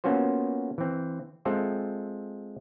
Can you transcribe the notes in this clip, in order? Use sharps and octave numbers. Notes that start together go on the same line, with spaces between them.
A#3 B3 C#4 F4 F#4 C5
E3 C4
G#3 C4 F4 A4 E5 G5